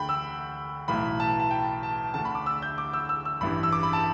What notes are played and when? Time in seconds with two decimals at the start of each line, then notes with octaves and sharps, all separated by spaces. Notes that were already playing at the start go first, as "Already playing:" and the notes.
Already playing: D2 D3 G5 B5
0.09 E6
0.88 B1 A2 E3 B5
1.20 A5
1.40 A5
1.51 G5
1.83 A5
2.14 D2 D3 A5
2.25 B5
2.35 D6
2.46 E6
2.62 G6
2.78 D6
2.93 E6
3.09 E6
3.25 E6
3.41 A1 G2 E3 B5
3.63 E6
3.73 D6
3.83 B5
3.93 A5